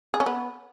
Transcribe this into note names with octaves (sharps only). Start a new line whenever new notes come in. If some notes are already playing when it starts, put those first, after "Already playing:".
G#4
C#4
B3